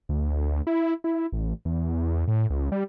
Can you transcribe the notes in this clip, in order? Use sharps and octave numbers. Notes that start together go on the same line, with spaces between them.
D2
E4
E4
A1
E2
A2
C#2
G3